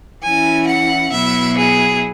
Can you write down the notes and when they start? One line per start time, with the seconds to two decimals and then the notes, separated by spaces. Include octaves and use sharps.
0.22 E3 C#4 E4 G#5
0.67 F#5
1.11 B2 F#3 B3 E4 E5
1.57 G#4